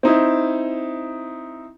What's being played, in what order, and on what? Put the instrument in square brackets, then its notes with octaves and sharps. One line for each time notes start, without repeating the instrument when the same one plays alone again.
[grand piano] C4 D#4 E4